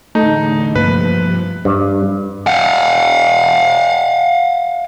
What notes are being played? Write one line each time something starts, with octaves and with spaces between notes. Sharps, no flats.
E2 A2 D3 A3 D#4
G2 C3 F3 A#3 B4
G2
F5 F#5